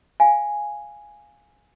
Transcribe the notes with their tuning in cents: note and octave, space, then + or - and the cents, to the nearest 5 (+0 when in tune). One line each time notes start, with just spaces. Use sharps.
F5 +0 G#5 +0